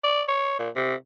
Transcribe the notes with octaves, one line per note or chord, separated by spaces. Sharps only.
D5
C#5
A#2
C3